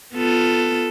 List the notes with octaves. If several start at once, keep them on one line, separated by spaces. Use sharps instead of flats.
B3 F4 A4